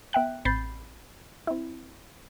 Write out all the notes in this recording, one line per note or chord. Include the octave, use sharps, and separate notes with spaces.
B3 E5 G5 F#6
A1 C4 B5 G6 A6 C7
C4 E4